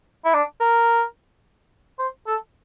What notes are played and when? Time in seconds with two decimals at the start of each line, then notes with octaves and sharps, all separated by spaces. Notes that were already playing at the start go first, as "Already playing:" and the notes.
0.25 E4
0.34 D4
0.61 A#4
1.99 C5
2.27 A4